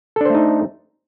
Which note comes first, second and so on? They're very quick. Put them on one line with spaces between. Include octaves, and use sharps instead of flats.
A4 D4 C5 A3 D#4